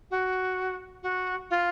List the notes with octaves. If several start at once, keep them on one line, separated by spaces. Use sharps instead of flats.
F#4
F#4
F4